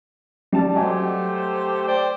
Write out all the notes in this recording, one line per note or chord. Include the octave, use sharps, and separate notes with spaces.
G3 A5
F#3 A3 G4 C5 D#5 G#5
C5 D5 G5